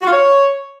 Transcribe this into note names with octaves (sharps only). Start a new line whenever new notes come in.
F#4
F4
C#5